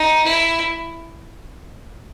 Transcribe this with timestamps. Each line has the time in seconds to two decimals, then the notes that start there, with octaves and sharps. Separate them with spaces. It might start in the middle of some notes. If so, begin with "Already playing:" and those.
Already playing: D#4
0.24 E4